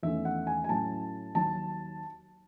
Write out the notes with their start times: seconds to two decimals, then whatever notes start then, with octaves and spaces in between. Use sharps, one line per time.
0.03 E2 D#3 A3 C#4 E5
0.25 F#5
0.47 G#5
0.64 G#5
0.69 A2 F#3 C#4 A5
1.35 D#2 D#3 F#3 A5